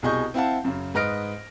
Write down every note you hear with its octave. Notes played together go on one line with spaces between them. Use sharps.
C2 B2 G#4 D#5 C#6 G6
C4 E4 F5 F#5 A5
F#2 C#3
G#2 B4 D#5 F6 A#6 D7